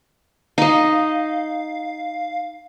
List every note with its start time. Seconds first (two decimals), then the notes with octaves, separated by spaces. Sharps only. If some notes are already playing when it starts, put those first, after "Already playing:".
0.58 D#4 D#5 F5